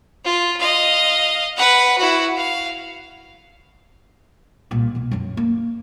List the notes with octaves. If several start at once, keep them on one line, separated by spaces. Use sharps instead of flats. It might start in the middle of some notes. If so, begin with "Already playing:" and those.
F4
D#5 F5
B4 F#5
E4 F#4
F5
C2 A#2
B2 B3
F#2 F#3
A#3